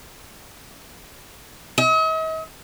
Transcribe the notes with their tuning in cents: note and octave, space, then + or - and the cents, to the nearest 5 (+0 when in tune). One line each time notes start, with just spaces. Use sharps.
D#5 +45